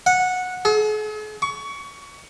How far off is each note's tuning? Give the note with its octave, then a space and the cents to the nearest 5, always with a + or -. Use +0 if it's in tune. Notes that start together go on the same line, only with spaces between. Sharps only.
F#5 -15
G#4 +45
C#6 +25